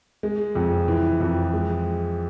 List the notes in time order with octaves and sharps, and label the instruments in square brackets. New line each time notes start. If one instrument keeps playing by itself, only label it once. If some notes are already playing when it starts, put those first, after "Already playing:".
[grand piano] G#3
F2
E3
F2
G#3